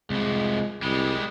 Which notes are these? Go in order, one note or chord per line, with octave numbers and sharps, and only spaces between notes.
C2 F3 G#3
C2 G3 G#3